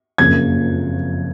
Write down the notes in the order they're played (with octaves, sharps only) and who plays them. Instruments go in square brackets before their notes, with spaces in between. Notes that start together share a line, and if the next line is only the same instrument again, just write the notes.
[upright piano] F#1 F2 F3 A#3 [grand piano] G#6